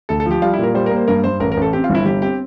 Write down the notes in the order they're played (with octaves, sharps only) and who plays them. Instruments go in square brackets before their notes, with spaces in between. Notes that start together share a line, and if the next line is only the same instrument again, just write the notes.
[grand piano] D2 [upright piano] A4
[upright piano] A4
[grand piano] F3 [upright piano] G4
[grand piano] G3 [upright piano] F4
[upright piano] E4
[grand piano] A#2 [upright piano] A#4
[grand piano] G3 [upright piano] C5
[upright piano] A#4
[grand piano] A#3
[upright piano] C5
[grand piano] G2 [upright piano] A#4
[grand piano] G2 [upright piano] C5
[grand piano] A1 [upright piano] A#4
[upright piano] A#4
[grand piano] A1 [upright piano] A4
[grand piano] C4 [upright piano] G4
[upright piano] F4
[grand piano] G1 [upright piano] E4
[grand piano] G1 [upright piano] G4
[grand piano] C4 [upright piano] G4